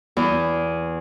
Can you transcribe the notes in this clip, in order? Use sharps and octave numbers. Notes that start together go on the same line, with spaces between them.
E2